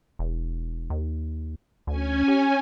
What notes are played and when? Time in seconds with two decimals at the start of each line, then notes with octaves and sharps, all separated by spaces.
0.19 E1
0.90 D#2
1.87 D2 C#4 G#5
2.28 G4